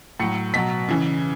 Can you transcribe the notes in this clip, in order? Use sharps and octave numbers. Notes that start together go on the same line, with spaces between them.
A2 F#3 C#7
B2 F#3 B6
C#3 E3